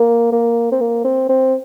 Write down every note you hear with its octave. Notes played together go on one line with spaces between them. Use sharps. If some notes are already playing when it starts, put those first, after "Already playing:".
Already playing: A#3
A#3
C4
A#3
C4
C4